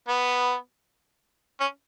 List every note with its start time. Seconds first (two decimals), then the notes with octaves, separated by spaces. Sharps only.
0.08 B3
1.60 C#4